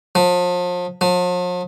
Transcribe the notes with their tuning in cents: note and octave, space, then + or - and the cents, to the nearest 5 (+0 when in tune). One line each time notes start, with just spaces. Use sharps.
F3 +35
F3 +45